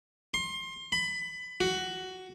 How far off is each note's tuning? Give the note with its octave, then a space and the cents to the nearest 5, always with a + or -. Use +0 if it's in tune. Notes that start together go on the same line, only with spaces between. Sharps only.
C6 +25
B5 +20
F#4 +10